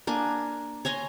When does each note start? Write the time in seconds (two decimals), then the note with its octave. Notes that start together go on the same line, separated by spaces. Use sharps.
0.07 A#3 D4 G#5
0.85 C#5 G#5 A#5 C6